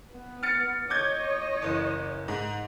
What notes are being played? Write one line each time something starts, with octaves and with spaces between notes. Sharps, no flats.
B3
F6 A6 C#7
C#5 D#5 D6 G6 G#6
F#1 E3
G#2